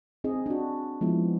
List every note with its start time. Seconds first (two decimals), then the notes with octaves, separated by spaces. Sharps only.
0.24 C4 D#4 G#4 D#5
0.46 D4 F#4
1.01 F3 G#3 B3 E4